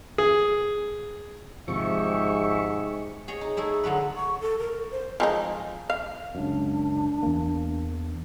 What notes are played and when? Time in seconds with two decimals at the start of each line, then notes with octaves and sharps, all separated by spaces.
0.18 G#4
1.68 G#1 G#2 C3 F3 G4 G#4 E5 C#6
3.28 G#4 C#5 D#5
3.41 D#4
3.57 A3 D#4 E4 G#4
3.84 D3 F#3 G#3 B4
4.17 C#6
4.41 A4
4.59 A#4
4.91 C5
5.20 F3 G#3 D#4
5.90 F5
6.35 C#2 F#2 D4
7.23 E2 A#3